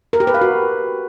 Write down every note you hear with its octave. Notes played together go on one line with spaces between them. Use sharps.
A#4
G4
B4
F5
F#4